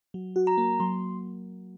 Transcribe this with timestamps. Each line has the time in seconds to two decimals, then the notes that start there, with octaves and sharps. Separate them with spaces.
0.14 F#3
0.36 F#4
0.47 A#5
0.58 A#3
0.80 F#3 C6